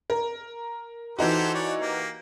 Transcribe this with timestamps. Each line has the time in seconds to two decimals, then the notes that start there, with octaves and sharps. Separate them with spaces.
0.10 A#4
1.19 E3 D#4 F#4 G4 A4 C5
1.55 C#5 D5
1.80 A#3 G4